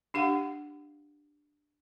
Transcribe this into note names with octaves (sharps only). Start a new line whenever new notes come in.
D4 G4 F5 F#5